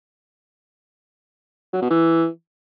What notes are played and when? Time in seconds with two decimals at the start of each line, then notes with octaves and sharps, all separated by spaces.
1.73 F#3
1.82 B2
1.91 E3